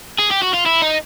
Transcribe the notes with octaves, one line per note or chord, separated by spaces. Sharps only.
G#4
G4
F#4
F4
E4
D#4